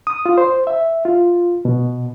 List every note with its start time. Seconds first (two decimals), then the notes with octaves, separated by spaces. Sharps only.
0.07 D#6
0.26 F4
0.38 C5
0.67 E5
1.05 F4
1.65 B2